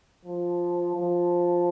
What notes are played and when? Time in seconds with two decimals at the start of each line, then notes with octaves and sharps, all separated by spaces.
0.25 F3
0.96 F3